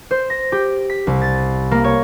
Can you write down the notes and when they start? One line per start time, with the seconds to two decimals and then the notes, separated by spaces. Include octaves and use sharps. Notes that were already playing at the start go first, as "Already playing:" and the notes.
0.11 C5
0.30 A#6
0.52 G4
0.90 B6
1.07 C2
1.22 A6
1.71 A#3
1.84 C#5